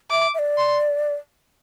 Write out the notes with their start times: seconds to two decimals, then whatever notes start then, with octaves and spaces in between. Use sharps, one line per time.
0.11 E5 D6
0.34 E5
0.39 D5
0.58 C6